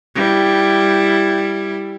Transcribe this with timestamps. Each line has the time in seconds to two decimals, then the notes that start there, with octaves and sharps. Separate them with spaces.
0.15 G3 E4